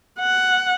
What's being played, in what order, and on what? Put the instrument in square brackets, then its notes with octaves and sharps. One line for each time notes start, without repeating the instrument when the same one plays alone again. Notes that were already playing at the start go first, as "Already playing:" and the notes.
[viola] F#5